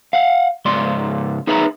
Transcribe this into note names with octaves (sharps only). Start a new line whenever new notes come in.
F5 F#5
C#2 G#2 D5 C6
D#4 G#4 B4 E5 A#5 B5